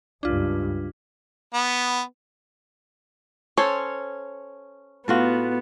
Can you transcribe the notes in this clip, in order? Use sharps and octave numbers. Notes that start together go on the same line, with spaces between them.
C#2 G2 D4 F4
B3
C#4 A4 C5 C#5
A2 B3 F4 F#4